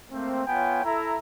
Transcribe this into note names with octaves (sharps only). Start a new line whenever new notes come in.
A3 A#3 C4
B3 F4 C#5 G5 G#5
E4 A4 E5 A#5